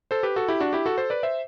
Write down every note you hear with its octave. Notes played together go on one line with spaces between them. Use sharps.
A4 C5
G4 B4
F#4 A4
E4 G4
D4 F#4
E4 G4
F#4 A4
A4 C5
B4 D5
C5 E5